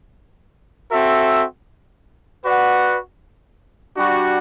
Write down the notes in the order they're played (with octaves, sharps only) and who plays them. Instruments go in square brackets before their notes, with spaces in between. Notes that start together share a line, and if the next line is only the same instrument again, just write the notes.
[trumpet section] C4 F#4 A4 E5
F#4 B4 D5 F#5
G3 D4 F#4